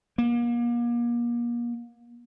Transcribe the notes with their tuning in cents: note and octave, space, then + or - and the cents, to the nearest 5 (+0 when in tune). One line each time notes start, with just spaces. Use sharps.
A#3 +35